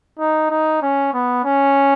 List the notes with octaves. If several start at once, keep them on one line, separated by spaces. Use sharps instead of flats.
D#4
D#4
C#4
B3
C#4